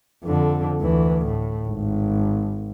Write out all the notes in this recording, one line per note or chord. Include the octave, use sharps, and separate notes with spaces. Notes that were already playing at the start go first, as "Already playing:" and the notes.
F2 D3
D2 E3
A2
G#1